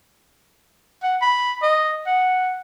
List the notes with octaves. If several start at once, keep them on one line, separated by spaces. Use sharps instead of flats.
F#5
B5
D#5
F#5